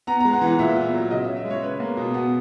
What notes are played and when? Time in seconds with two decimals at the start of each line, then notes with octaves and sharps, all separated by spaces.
0.07 B3 A#5
0.20 A#5
0.25 G#3
0.33 F#5
0.42 E3
0.47 F#5
0.59 A#2 E5
0.76 B3
0.94 F#3
1.10 C#3 D#5
1.24 E5
1.28 C#4
1.37 E5
1.45 G#3
1.50 C#5
1.63 C#4 B4
1.80 A#3
1.97 B2
2.14 B3